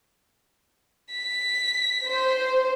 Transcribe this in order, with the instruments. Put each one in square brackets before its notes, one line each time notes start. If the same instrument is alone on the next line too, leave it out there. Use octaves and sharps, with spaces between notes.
[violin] B6
[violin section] C5